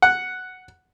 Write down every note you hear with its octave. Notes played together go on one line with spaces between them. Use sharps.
F#5